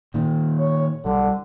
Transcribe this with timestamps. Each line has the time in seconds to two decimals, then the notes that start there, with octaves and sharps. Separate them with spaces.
0.14 A#2 D#3
0.58 C#5
1.05 B1 D3 G3